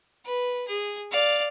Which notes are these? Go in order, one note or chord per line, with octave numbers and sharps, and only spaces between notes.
B4
G#4
D5 F5